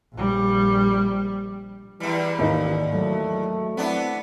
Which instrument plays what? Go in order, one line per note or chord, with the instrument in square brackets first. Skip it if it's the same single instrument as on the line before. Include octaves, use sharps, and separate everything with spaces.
[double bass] A#1 G3
[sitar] E2 G3 [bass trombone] E3
[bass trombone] A1 [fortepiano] D#2 D#4 [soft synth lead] G#2
[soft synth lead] F#3 [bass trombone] A3
[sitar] B3 D4 E4 [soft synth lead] C4